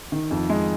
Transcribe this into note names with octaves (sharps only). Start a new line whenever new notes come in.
D#3
F2
G#3